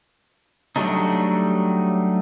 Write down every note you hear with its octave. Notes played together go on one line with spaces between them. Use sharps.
F#3 G3 A3 D4 D#4